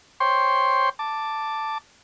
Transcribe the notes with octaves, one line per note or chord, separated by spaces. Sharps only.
C5 C#5 G5 C6
A5 D6